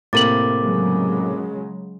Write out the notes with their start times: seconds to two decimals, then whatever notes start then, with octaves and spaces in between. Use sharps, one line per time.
0.13 A2 C3 A#3 A#4 D6 A6 F#7
0.61 C#3 F#3 G#3